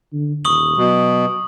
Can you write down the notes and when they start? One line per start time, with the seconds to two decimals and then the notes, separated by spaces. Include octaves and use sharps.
0.13 D3
0.45 D#1 C#6 D#6 F#7
0.77 B2 F#3